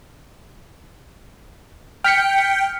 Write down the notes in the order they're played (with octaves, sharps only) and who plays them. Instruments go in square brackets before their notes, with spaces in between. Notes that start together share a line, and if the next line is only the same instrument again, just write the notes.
[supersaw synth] G5 [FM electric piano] F6 B6 C#7